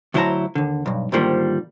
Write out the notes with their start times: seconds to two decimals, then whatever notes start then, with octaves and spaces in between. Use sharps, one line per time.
0.14 D2 F#3 E4 C5 A5 A#5
0.55 D#2 D3
0.86 B1 G2
1.12 G#2 D3 D#3 F3 G3 A#3